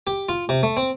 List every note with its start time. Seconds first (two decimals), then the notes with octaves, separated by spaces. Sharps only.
0.07 G4
0.29 F4
0.49 C3
0.63 A3
0.77 C4